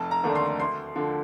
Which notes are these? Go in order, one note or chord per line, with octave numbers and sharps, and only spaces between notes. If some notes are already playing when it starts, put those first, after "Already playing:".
Already playing: F1 A5
A#5
D#2 D3 A3 D4
C6
D2 C6
D3 F3